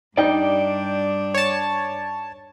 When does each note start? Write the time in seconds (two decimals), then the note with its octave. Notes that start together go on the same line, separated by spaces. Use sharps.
0.17 G2 D4 D#4 D5 G5
1.34 C#5 A5